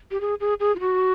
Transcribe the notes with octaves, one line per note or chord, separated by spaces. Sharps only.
G4
G#4
G#4
G#4
F4
F#4